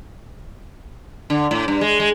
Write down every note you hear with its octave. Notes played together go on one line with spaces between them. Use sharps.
D3
A2
G2
G#3
G#3